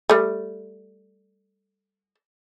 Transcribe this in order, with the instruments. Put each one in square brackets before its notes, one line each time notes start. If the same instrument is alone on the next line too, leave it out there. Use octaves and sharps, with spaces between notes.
[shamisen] G3 A3